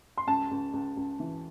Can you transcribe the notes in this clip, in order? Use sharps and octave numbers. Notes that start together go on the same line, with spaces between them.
C6
C#2 A5
C#2
C#2
C#2
E3